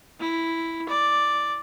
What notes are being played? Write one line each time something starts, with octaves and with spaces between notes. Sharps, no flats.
E4
D5